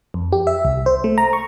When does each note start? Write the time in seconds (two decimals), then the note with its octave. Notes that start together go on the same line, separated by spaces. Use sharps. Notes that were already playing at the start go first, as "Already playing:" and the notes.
0.14 F2
0.32 G4
0.47 E5
0.65 C2
0.86 C5
1.04 A3
1.18 A#5
1.33 C#6